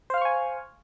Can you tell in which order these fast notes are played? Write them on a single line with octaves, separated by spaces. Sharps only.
C5 F5 F6 C#6 G#5